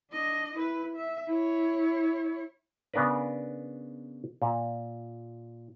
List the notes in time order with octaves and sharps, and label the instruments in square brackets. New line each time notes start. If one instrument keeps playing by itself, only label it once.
[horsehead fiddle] D4 D#5
E4 B4
E5
E4 C#5
[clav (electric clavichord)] C#3 B3 D4 A#4 B4
A#2